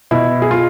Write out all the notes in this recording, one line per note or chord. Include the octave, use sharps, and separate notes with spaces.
B2 E4
G#4
F4